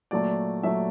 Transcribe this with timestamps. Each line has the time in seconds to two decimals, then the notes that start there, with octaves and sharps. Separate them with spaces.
0.11 A#2 F#3 A3 D5
0.63 A#2 F#3 A3 E5